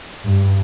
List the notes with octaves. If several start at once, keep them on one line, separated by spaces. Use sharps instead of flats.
G2